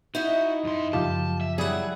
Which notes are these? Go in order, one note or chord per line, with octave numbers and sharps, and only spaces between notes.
D#4 E4 F#4 D#5
F#2 C6
F#2 C#3 F3 F4 G4 A5
E5
F#3 G3 E4 G#4 F#5